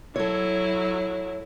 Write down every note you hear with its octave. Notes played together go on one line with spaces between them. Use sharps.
F#3 E4 A4 C#5